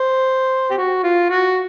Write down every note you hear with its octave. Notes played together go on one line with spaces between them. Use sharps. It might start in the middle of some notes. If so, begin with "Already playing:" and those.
Already playing: C5
G4
F#4
F4
F#4